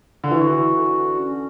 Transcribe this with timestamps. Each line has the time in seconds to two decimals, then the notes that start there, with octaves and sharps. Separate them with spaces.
0.24 D3
0.31 E3 F#4
0.75 D3
1.17 C#4